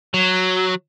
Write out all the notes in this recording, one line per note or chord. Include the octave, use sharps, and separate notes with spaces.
F#3